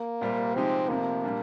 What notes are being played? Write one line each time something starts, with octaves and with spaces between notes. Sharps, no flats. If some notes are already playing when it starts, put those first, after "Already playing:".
Already playing: A#3
C2 A#2 G3 C4
C3 F3 G#3 C4 D#4 G4
F1 F2 C3 F3 A#3
A#2 G3 D4